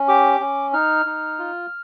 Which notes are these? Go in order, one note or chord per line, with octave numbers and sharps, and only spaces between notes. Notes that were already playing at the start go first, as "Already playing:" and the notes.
Already playing: C#4
G4 D6
C#4
D#4 F6
D#4
F4